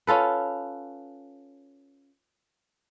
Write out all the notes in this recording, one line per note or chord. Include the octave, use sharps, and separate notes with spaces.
C#4 F4 A4 B4